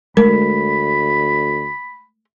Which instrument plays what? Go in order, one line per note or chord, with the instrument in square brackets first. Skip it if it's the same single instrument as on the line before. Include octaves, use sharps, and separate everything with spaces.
[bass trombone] D2 [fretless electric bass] G#3 A3 [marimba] A#4 [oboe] B5